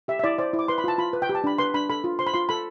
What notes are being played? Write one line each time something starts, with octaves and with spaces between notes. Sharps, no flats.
G4 E5
E5
E4 D5
C5 D5
E4
D6
B4 C6
B5
F4 A5
F4 B5
B4
G5
G4
A5
D4 B5
B4 C6
D4 B5
A4 B5
F4
C5 C6
B5
F4 C6
A4 B5